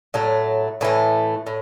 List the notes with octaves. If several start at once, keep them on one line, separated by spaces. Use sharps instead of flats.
A2 F#3 A3
A2 E3 A3
A2